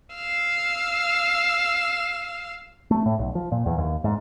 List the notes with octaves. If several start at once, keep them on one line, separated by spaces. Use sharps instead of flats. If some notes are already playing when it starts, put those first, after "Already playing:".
F5 E6
A3
A2
B1
F3
A#2
E2
D#2
G#2